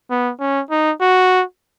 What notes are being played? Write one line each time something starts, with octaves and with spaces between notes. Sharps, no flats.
B3
C#4
D#4
F#4